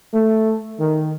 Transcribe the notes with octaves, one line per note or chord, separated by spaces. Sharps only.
A3
D#3